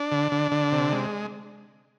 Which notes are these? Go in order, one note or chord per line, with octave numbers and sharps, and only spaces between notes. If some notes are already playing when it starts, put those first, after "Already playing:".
Already playing: D4
D3
D3
D3
C3
G#3